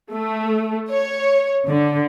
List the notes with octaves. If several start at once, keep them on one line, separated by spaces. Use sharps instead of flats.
A3
C#5
D3